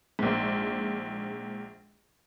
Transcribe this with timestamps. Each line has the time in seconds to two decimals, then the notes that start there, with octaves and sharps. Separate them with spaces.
0.19 A#1 G#2